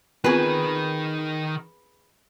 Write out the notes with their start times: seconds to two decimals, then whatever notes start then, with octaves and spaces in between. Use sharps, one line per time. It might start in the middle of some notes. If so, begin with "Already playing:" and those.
0.24 D#3 B3 C4 F4 G#4 A#4 B4